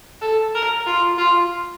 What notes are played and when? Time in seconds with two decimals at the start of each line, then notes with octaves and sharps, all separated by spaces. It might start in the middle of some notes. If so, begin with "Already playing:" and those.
0.22 A4
0.55 A#4
0.87 F4
1.18 F4